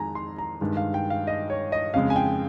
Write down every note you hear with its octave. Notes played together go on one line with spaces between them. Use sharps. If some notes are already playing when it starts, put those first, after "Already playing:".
Already playing: F2 D#3 G#3 G#5 A#5
C6
A#5
G2 D#3 G#3
F5
G5
F5
D#5
C#5
D#5
F2 C#3 G#3 F5
G#5
G5